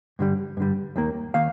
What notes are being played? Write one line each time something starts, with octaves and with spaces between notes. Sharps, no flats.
G2 D3 G3
G2 D3 G3
D#2 D#3 A#3
D#3 A#3 F5